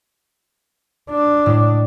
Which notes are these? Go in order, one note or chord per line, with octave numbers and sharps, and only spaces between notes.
D4
A2 G#3